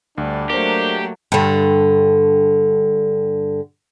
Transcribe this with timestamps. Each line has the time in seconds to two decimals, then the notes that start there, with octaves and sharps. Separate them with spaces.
0.18 D2 G3 D4
0.50 F#3 A3 A#3 G4 A#4 C5
1.32 G2 D3